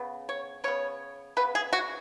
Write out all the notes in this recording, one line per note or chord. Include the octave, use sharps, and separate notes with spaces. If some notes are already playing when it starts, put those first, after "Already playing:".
Already playing: C#3 B3
C#5
C#3 B3 C#5
C#3 B3 B4
G#4
F#4